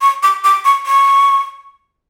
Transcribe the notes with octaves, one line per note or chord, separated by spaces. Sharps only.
C#6
D6
D6
C#6
C#6